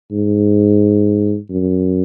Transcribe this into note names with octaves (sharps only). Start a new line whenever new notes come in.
G#2
F#2